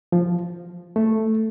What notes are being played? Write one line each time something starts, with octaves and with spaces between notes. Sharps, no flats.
F3
A3